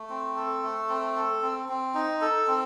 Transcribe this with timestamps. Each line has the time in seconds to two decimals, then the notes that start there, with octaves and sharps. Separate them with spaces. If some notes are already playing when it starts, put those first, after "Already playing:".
Already playing: A3
0.10 C4
0.36 A4
0.63 A3
0.89 C4
1.16 A4
1.42 C4
1.69 C4
1.95 D#4
2.21 A4
2.48 C4